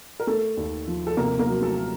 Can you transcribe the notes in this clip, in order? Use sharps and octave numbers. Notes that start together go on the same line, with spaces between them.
A#4
A3 A4
D#2
F3
A4
C3 A#3 A#4
A#3 A#4
F#3
A3 A4